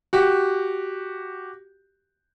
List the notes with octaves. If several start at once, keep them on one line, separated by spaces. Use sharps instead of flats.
F#4 G4